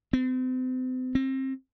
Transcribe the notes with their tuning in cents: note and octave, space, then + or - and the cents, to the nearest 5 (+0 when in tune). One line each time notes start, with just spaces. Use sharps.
C4 -40
C4 +25